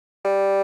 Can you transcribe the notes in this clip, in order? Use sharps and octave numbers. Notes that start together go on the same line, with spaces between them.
G3